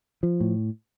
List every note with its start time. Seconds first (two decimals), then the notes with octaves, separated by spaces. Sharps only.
0.23 F3
0.40 A2